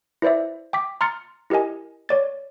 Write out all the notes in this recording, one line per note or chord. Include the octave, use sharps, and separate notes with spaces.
E4 B4 C5 D5 E5
G5 D6 B6
A#5 C6 F6 A6 C#7
E4 G4 A#4 D#5 G#5
C#5 D5 A6